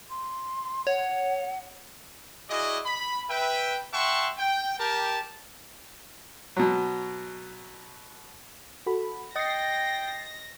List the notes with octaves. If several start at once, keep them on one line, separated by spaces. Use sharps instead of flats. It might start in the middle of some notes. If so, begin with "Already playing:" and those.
C6
C#5 F#5
E4 F#4 G#4 D5 D#5
B5
B4 E5 G5
E5 F#5 G5 A5 C6 C#6
G5
G4 A#4 A5
B2 F#3
F#4 A4 B5
D#5 G5 D#6 A6 A#6 C7 C#7